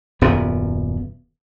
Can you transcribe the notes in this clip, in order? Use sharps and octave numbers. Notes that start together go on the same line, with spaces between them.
D#1 F#2 B3